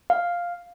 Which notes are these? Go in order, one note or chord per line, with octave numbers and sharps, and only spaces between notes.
F5